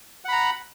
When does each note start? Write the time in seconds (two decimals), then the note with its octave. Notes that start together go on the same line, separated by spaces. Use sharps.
0.25 F#5
0.28 B5
0.32 A#5